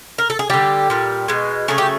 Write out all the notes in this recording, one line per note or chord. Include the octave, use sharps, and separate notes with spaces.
A#4
A4
G#4
D3 G3 G4
A#2 G3
B2 G#3
C#3 F#3 A3 G#4
G4